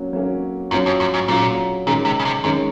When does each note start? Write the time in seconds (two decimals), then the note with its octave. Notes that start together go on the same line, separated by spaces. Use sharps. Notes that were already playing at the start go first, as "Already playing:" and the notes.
Already playing: F#3 A#3 C#4
0.13 F#3 A#3 C#4
0.71 F#2 F#3 C#4 F4
0.86 F2
1.00 F#2
1.14 G#2
1.28 A#2 F#3 C#4 F4
1.86 A#2 D#3 G#3 C#4
2.05 C3
2.20 C#3
2.25 C3
2.44 F#2 D#3 G#3 C#4